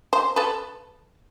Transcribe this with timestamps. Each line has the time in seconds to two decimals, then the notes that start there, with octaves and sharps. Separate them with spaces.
0.13 C5
0.36 A4 B4